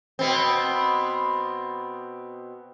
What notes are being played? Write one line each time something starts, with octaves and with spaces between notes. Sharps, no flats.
B2 B3 C4